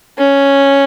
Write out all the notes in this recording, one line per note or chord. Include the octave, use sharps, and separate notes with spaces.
C#4